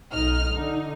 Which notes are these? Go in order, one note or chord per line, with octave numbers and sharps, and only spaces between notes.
B1 D#4 D#5 F6
D3 D#4